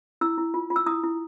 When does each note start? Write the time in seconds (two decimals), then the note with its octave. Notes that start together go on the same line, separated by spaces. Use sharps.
0.21 E4 E6
0.38 E4
0.54 F4
0.70 F4
0.76 E6
0.86 E4 D#6
1.04 E4